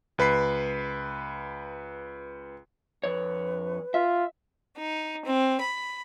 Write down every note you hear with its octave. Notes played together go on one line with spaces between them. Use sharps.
C#2 B4 B5 C7
F2 B4 C#5
F4 E5
D#4
C4
B5